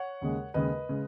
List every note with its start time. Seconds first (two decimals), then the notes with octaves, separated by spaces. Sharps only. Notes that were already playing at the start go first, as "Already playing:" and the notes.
Already playing: C#5 F#5
0.21 D#2 C#3 G#3
0.54 D#2 C#3 G#3 B4 D#5
0.89 C#3 G#3